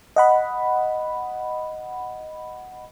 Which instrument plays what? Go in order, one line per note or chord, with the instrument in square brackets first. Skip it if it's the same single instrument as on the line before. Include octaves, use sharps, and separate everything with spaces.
[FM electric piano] D#5 F#5 B5